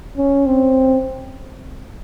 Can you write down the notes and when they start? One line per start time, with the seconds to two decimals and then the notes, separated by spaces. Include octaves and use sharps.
0.18 C#4
0.46 C4